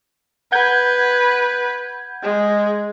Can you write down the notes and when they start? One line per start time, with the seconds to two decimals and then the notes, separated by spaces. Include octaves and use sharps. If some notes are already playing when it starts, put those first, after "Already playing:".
0.52 B4 F#5 G6 G#6
2.22 G#3